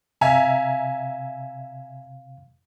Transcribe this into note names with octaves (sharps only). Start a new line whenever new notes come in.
C3 E5 F5 G#5 A#5